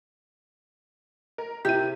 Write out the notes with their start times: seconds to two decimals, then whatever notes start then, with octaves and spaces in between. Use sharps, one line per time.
1.38 A#4
1.65 C3 E4 G4 D#7